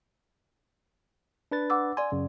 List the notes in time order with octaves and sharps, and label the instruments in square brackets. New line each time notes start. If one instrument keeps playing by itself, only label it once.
[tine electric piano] D4 B4 A6
[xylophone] F#5 D6 E6
[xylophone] D5 C6 [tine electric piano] G#5
[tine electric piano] F#2 C#3